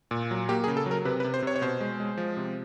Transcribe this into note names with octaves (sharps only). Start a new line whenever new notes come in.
A#2
F#3
A#3 G4
G#4
C#3
A4
F#3 A#4
C3 B4
B4
C3
C5
C3 C#5
C#5
B2 C5
G#3
G#3
F3
C3